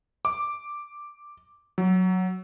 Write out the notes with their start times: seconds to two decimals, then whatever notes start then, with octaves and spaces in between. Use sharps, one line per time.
0.25 D6
1.78 F#3